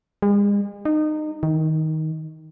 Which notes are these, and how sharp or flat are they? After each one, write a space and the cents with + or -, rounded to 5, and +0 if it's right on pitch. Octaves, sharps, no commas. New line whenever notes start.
G#3 -40
D#4 -25
D#3 +15